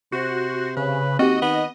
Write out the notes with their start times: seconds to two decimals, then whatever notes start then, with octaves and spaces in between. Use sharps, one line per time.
0.12 C3 F#4 C5
0.77 C#3 B4
1.19 D#2 C4 F#4 G4 D#5
1.42 D#3 B3